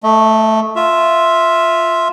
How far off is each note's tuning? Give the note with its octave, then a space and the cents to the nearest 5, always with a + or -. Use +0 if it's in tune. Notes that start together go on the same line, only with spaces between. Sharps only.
A3 +0 D#5 +40
F4 +0 E5 +0